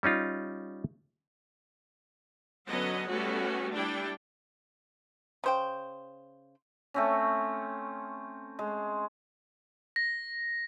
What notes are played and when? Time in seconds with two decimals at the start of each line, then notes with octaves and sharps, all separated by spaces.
0.03 G3 C#4 D#4 F4
2.69 D3 F#3 B3 C#4 D#5 F#5
3.08 G3 A3 B3 C#4 F#4
3.75 G3 D4 E4 G5
5.44 C#3 C5 G5
6.94 A3 C4 C#4
8.59 G#3
9.96 A#6